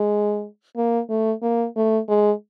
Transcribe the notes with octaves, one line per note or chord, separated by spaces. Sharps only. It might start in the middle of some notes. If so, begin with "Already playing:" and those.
Already playing: G#3
A#3
A3
A#3
A3
G#3